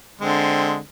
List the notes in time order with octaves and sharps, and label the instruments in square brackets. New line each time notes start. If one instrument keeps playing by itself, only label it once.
[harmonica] D3 G#3 C4